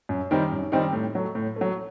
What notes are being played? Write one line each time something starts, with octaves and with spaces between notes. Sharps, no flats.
F#2
D#3 G3 C4 D#4
F#2
D#3 G3 C4 D#4
A2
F#3 A3
A2
F#3 A3